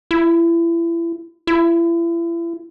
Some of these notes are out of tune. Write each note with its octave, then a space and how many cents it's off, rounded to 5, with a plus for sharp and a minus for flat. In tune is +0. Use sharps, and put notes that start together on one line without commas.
E4 +30
E4 +35